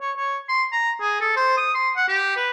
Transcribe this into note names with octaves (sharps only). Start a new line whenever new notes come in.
C#5
C#5
C6
A#5
G#4
A4
C5
D#6
C6
F#5
G4
B4